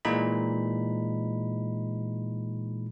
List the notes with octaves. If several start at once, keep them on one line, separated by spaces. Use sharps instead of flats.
A#2 E3 G#3 D#4 B5